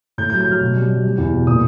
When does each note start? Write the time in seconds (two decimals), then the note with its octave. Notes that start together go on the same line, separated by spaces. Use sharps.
0.18 A2 G6
0.30 G6
0.33 F#3
0.40 G6
0.47 F#3 F6
0.61 B2
0.76 G3
0.90 G3
1.05 G3
1.18 E2
1.33 B2
1.47 A#2 D#6